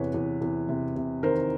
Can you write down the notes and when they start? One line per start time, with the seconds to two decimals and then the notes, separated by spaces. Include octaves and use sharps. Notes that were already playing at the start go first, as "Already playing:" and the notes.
Already playing: E2 C3 B4 C#5
0.14 E2
0.41 E2
0.69 C3
0.96 C3
1.23 D#3 A#4 C5